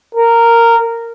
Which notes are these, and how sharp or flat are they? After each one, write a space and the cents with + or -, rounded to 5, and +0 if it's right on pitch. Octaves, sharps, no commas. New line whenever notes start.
A#4 -10